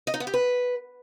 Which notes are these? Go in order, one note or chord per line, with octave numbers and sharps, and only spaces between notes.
D#5
D#4
B3
G4
B4